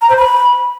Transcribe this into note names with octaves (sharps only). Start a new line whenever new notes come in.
A#5
C5
B5